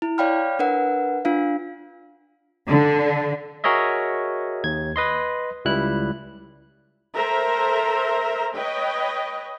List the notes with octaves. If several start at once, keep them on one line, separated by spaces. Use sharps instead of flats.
E4
C#5 D5 F5 G5 B5 F6
D4 A#4 B4 F#5
D4 F4 F5
D3
F#4 G#4 A#4 C#5 D#5 E5
D#2 G#6
B4 D#5 C6
C#2 G3 E4 F#6
A4 A#4 C5 E5 A#5
B4 C#5 D#5 G5